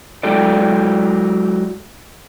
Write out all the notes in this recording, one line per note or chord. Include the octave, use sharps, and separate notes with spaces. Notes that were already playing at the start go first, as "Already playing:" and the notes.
F#3 G#3 E4 G4 A4 D5